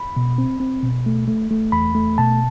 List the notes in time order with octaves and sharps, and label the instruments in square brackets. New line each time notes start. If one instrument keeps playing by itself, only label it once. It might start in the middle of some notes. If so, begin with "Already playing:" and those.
Already playing: [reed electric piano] B5
B2
C4
C4
B2
A3
A3
A3
E2 B5
A3
B2 A5